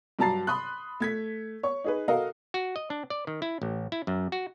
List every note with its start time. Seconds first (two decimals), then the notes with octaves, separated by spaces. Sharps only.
0.19 G2 F#3 A5 A#5 A6 C7
0.47 B5 C6 D#6 F#6
1.00 A3 G#6 B6
1.63 C#5 C#6
1.84 D#4 G#4 B4
2.08 F#4 A4 A#4 D#5 F5
2.54 F#4
2.76 D#5
2.90 D4
3.10 D5
3.27 D#3
3.42 E4
3.62 A1
3.92 E4
4.07 F#2
4.32 F#4